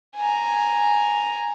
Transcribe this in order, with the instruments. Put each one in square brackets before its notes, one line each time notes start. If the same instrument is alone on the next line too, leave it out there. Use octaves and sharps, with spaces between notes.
[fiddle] G#5 A#5